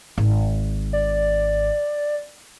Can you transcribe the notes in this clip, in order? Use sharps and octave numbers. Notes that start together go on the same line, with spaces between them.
G#1
D5